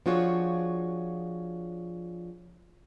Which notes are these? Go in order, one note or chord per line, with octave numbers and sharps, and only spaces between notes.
F3 D4 F4 F#4 G#4 C#5